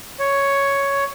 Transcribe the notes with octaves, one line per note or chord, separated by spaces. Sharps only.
C#5